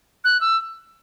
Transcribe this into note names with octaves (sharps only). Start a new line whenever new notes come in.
F#6
E6